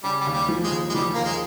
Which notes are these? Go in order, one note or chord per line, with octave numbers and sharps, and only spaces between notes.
C#3 G3
G3
D#2
G3
F3
G#3
D#2
G#3
F3 G3
D#2 A#3
G#3